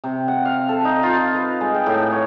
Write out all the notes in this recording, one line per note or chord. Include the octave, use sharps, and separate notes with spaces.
C3
F#5
F5
A4
D#4
F4
B4
G#3
G5
A2
C#5